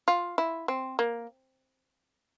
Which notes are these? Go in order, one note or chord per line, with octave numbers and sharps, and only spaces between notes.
F4
E4
C4
A#3